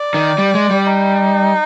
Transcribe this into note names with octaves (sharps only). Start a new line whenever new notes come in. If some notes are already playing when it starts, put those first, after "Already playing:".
Already playing: D5
D#3
G3
G#3
G3
D#4